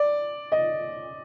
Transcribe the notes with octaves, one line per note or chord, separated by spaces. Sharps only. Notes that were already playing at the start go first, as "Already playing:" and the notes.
Already playing: D5
D#5